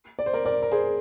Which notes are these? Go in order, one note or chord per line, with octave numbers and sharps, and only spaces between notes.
D5
C5
A#4 D5
A#4 D5
A#4
G#4 C5